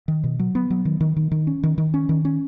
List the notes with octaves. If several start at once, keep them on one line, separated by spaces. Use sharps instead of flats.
D#3
B2
F#3
B3
F#3
D#3
D#3
D#3
D#3
C#4
D#3
D#3
C#4
D#3
C#4